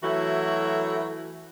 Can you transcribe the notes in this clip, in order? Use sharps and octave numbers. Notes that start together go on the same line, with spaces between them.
E3 F#3 A3 E4 F#4